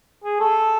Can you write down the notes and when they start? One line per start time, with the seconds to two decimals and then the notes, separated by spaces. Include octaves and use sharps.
0.24 G#4
0.40 A4